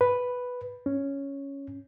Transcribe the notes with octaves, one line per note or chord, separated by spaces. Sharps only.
B4
C#4